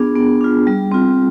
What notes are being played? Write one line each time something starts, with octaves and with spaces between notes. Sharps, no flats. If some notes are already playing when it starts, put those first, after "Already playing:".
Already playing: B3 D4 F4 G#4
B3
D4 F4
G3
C4 F4